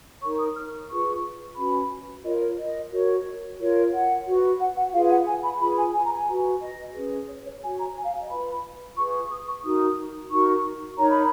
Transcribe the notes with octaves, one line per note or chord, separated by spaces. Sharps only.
D#4 A#4 C#5 C#6
D#6
F6
F4 G#4 B4 C#6
C#4 F#4 B4 B5
F4 A#4 C#5 D#5
C#5
D#5
F#4 A#4 C#5
F4 A#4 C#5
F#5
F#4 B4
F#5
F#5
F4 G#4 B4 F5
F#5
G#5
B5
F4 G#4 B4 B5
G#5
G#5
A#5
G#5
F#4 B4
D#5
C#4 G#4 B4
C#5
C#5
F#4 C#5 G#5
A#5
G#5
F5
D#5
F4 B4 B5
F4 G#4 B4 C#6
C#6
D#6
C#6
D#4 F#4 A#4 D#6
D#4 F#4 A#4 C#6
D#4 A#4 C#5 A#5
B5